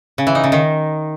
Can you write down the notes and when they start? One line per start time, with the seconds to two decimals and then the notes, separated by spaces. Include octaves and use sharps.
0.18 C#3
0.27 E3
0.35 D#4
0.44 C#3
0.52 D#3